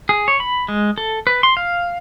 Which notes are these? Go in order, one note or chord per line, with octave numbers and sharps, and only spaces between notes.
G#4
C#5
B5
G#3
A4
B4
C6
F5